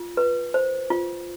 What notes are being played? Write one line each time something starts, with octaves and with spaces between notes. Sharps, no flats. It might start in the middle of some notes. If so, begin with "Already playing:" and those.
Already playing: F4
B4
C5
F4